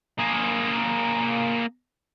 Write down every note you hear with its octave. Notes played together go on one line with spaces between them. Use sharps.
A#3 G#4